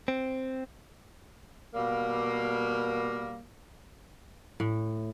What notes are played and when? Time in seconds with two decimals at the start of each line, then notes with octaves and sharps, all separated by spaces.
0.08 C4
1.74 B2 G3 A#3
4.60 A2